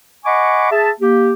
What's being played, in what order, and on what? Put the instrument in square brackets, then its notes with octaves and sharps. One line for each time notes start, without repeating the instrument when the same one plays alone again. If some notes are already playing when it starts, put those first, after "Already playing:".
[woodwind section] D#5 F#5 G#5 B5 C#6 D6
G#4 E5 A5
A#3 G4